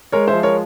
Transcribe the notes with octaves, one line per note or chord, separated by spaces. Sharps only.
G#3 A#4 C#5
C5 E5
F3
A#4 C#5